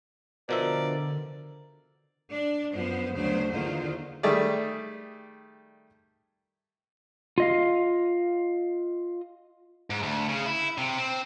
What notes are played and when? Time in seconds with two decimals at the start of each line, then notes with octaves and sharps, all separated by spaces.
0.49 B2 D3 F3 A#4 D5 E5
2.33 D4
2.74 F#2 F3 B3 C5
3.14 D2 C#3 F#3 B3 D4 C5
3.50 E2 D3 D#3 A#3 F4 C5
4.23 D#3 G3 A3 G#4 D5
7.38 F4 D#5 F5
9.90 G#2
10.03 D2
10.29 C#3
10.46 E4
10.78 C3
10.98 C4